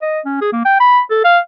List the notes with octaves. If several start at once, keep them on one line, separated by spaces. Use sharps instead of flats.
D#5
C#4
G#4
A#3
G5
B5
A4
F5